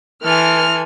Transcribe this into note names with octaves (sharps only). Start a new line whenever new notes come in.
E3 A4 G#5 C6 F6